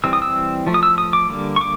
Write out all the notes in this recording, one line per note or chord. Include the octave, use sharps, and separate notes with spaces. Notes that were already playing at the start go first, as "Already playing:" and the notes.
E3 G3 C4 E6
D#6
E6
F3 A3
D#6
E6
D#6
D6
D3 G3 A#3
C#6
D6